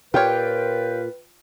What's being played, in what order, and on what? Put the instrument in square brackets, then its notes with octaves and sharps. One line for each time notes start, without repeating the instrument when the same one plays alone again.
[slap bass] A#2 [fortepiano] F4 G5 F6 [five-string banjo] G4 C#5 [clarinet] B4